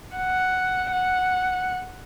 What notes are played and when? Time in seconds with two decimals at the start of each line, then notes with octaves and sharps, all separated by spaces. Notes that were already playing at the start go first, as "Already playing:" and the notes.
0.16 F#5
0.92 F#5